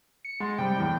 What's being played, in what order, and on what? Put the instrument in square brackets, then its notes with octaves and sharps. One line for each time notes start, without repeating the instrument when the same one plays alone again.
[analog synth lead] C#7
[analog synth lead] G#3 [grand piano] F#5 C6 A6
[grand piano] C3 G3 [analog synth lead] G5
[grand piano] E2 A2